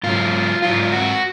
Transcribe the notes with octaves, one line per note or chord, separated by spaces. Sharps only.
G#2 F#3 F4
G#2 F#3 F4
F#4